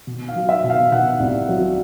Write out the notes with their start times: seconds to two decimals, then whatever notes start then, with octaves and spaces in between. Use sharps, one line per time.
0.07 B2
0.28 F5
0.35 F#3
0.49 E5
0.64 B2
0.70 F5
0.91 B2 F#5
1.20 C2
1.49 F#3